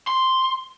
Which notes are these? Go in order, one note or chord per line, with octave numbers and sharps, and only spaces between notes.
C6